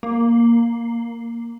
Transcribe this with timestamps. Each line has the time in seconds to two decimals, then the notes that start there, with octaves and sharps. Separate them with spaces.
0.03 A#3